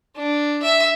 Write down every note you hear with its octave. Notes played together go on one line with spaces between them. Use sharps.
D4
E5